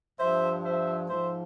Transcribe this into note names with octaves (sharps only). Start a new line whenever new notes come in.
G2 F3 C5 E5
C5 E5
G#2 F3 C5 E5